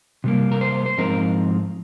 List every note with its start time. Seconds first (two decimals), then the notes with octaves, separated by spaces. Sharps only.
0.24 C3 G3 A#3
0.52 A#4
0.61 C5
0.86 C5
0.98 G#2 F3 C4 D#4 A#4